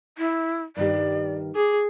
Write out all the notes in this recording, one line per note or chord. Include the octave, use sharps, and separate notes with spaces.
E4
G2 D#3 G4 D5
G#4 D6